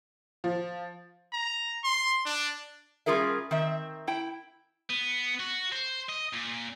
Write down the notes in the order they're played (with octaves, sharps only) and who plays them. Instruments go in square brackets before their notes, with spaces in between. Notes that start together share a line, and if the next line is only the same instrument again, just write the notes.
[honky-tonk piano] F3
[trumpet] A#5
C6
D4
[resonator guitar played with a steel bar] G3 C#4 F4 G#4 A#4 E5
D#3 C4 E5
E4 G5
[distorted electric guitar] B3
F#4
C5
D#5
A#2